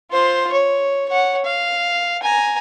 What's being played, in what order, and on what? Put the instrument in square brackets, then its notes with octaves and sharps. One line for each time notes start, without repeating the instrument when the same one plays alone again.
[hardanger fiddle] F4 C5
C#5
C#5 F#5
F5
G#5 A#5